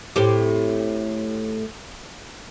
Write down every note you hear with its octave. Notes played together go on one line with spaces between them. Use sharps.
A2 C4 G4